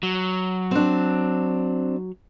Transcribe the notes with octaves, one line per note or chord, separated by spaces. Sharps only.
F#3
C4 D4